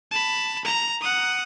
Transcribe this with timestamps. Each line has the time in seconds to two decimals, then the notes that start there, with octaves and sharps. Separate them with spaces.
0.11 A5 B5
0.65 A#5
1.01 F#5 D#6